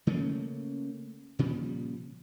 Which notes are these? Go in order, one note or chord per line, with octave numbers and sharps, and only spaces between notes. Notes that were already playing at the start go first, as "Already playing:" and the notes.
C#3 A3 A#3 C#4
A#2 C#3 F3 G3